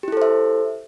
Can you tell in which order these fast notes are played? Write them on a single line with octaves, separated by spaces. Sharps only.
G4 E4 A4 C5 E5